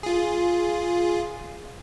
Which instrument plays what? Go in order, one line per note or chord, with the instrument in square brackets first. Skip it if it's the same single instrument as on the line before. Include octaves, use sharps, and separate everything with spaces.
[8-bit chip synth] F4 G#4